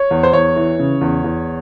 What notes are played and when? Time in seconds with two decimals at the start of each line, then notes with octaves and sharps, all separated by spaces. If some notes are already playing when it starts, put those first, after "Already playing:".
Already playing: C#5
0.11 E2
0.23 C5
0.33 E2 C#5
0.56 E3
0.79 C#3
1.01 E2
1.24 E2